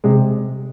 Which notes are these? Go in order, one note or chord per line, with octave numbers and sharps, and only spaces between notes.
C3 G#3